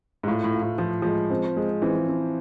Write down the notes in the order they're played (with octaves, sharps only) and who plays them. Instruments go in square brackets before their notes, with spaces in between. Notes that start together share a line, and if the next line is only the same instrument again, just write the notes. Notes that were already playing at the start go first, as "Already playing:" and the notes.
[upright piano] G#2
[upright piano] A2 [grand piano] F4
[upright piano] A2
[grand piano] F4
[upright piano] A2
[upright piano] F3 [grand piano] F4
[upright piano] F3 [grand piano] G#3
[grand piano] C4
G#3
[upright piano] E3 [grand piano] C4
[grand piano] C4